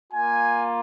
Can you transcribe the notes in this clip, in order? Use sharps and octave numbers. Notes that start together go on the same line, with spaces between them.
A#3 F4 G#5